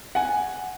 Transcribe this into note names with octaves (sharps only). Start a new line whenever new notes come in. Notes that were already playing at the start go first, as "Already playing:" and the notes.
F#5 G#5